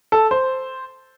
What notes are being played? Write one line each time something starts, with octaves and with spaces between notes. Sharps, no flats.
A4
C5